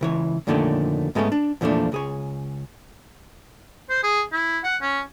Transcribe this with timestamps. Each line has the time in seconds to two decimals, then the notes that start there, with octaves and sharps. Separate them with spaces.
0.01 C#2 E3 C#5
0.47 F2 A#2 D3 D#3 A3 C#4
1.15 G#2 G#3 A3 B3 C#4
1.32 D4
1.61 E2 A#2 F3 A3 D4
1.92 C#2 G#4 C#5
3.90 C5
4.03 G#4
4.32 E4
4.64 F#5
4.82 C#4